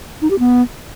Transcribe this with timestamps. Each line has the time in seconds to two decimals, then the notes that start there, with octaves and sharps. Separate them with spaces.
0.22 D#4
0.31 G4
0.39 B3